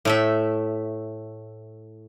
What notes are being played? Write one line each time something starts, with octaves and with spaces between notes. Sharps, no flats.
A2 A3 E5